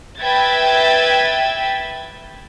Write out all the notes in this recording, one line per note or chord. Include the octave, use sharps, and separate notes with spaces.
B4 E5 G5 G#6 A6